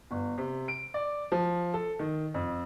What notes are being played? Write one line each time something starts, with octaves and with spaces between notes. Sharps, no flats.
G1
C3
D7
D5
F3
A4
D#3
F2